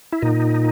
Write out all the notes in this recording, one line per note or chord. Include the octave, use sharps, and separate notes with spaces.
E4
A#2 D#4